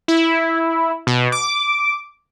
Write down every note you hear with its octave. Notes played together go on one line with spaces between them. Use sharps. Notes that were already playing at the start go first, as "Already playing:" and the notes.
E4
B2
D6